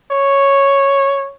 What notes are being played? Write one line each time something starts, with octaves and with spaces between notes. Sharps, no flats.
C#5